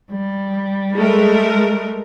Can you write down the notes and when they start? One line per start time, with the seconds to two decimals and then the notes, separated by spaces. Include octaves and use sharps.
0.11 G3
0.93 G#3 A3 A#4